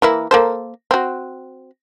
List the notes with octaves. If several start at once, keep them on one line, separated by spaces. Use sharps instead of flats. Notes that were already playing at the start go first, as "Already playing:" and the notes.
E3 A#3 E4
A#3 A4 C5
C4 F#4